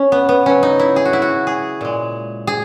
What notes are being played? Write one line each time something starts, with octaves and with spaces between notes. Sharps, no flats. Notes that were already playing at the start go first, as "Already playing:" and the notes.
Already playing: C#4
B3
B3
C#3 F#3 C#4
D#4
E4
G#4
F#4
E4
F#4
G#4
A#2 G#3
G#4